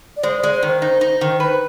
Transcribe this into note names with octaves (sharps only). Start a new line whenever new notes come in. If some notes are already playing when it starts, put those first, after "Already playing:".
D5
G#3 C5
D5
G#3
C5
D#3 C5
D#4
D#4
D#3
B4